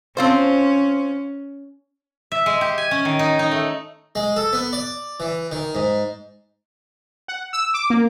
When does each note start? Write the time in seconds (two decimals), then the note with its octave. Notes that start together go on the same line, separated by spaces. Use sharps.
0.17 C4 C#4 F4 C5
2.32 E5
2.46 G#3
2.61 G4
2.78 G#5
2.91 C#4
3.05 D#3
3.19 D#4
3.39 D#4
3.51 A3
4.15 G#3
4.36 A4
4.53 B3
4.73 D5
5.20 E3
5.52 D#3
5.75 G#2
7.28 F#5
7.53 E6
7.74 D6
7.90 A#3